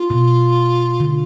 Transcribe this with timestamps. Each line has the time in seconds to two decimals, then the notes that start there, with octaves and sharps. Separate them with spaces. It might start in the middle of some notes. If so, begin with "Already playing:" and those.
Already playing: F4
0.10 B2
1.00 D3